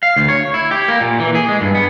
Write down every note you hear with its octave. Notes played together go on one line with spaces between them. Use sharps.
F5
D2
C#5
E4
G4
A#3
A#2
E3
G#4
G#3
G2
B3